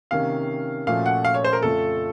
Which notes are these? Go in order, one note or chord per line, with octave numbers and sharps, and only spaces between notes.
C3 D#3 A#3 C#4 F5
A#2 F3 A3 C#4 F#4 F5
F#5
F5
C#5
C5
A#4
F2 C#3 A3 C#4 F4 A4